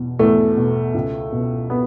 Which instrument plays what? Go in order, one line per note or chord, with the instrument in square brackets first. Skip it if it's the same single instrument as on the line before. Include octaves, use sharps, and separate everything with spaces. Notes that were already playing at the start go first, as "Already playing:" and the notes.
Already playing: [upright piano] E2 B2
E2 A3
B2
C#2
B2
B3